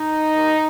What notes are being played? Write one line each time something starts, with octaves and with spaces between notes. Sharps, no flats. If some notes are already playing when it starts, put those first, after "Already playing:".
Already playing: D#4
D#2 D#3